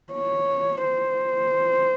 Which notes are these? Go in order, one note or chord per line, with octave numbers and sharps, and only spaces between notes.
C#5
C5